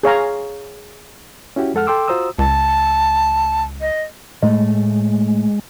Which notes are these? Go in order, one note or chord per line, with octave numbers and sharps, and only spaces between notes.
G#4 C#5 F5 A#5
C#4 E4 F#4 G4
F2 G#3 A4 F#5 F6
A4 G5 C6 D6 E6
F4 F#4 C5 A#5 D#6 E6
C#2 A5
D#5
A2 G#3 A3